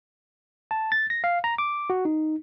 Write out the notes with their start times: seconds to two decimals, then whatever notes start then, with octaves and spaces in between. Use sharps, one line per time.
0.71 A5
0.92 A6
1.10 A#6
1.24 F5
1.44 A#5
1.58 D6
1.90 F#4
2.05 D#4